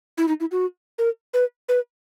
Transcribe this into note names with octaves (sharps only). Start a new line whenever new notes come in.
E4
D#4
E4
F#4
A#4
B4
B4